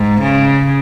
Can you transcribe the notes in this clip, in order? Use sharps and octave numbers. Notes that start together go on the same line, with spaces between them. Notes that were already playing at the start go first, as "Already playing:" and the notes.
Already playing: G#2
C#3